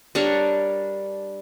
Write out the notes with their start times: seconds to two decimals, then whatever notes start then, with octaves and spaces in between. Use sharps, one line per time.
0.15 G3 D4 A#4 C#5